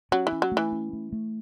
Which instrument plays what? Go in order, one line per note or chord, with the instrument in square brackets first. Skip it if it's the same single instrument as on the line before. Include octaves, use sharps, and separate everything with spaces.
[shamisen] F#3 [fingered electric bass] C#4
[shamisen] E3
[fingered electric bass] C#4
[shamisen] F#3
[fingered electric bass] A3
[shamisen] E3
[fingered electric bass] C#4
A3
A3